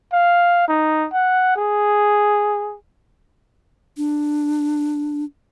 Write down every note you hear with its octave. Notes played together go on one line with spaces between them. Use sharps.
F5
D#4
F#5
G#4
D4